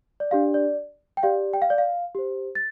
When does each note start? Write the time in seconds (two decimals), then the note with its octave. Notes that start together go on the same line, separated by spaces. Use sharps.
0.20 D5
0.31 D4 G4 D5 F5
0.54 D5
1.17 G5
1.23 G4 D5 F5
1.54 G5
1.62 F5
1.70 D5
1.78 F5
2.15 G4 C5
2.55 A6